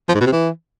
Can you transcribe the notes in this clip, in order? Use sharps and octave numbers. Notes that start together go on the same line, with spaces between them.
F3
G#2
B2
C3
E3